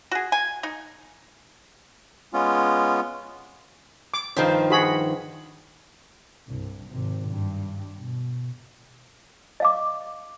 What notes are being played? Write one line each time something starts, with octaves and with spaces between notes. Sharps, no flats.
F#4 G#4
G#5
D#4
G#3 B3 C#4 F4
D6
G2 D#3 F3 C5
F#4 G#4 B5
C2 G2
G#1 C3
G2
B2
D#5 F5 D6